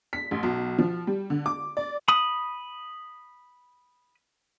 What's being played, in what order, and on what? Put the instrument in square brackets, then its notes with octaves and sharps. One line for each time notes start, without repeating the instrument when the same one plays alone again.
[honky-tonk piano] B6
A1
B1
F3
G3
D3
D6
D5
[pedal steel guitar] B5 D#6